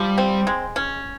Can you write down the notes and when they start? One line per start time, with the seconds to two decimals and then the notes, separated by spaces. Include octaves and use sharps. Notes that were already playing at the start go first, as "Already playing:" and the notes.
Already playing: F3 G3
0.18 C4
0.47 G#3
0.76 C#4